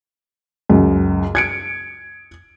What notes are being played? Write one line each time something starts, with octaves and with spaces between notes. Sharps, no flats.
C#2 F#2
G#6 C#7 D7